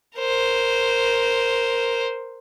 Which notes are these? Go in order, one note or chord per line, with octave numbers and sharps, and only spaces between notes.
A#4 C5